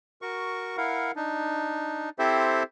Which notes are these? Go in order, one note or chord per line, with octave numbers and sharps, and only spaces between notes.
F#4 A#4 C#6
E4 A#4 F5 F#5
D4 D#4
C4 E4 G4 A4 C5 E5